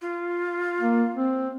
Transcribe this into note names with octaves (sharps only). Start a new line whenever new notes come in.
F4
A#3
C4